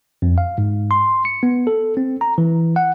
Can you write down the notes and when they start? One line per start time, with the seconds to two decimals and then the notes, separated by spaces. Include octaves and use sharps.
0.22 F2
0.38 F5
0.58 G#2
0.91 C6
1.25 C#7
1.43 B3
1.67 A4
1.97 C4
2.21 A#5
2.38 E3
2.76 F#5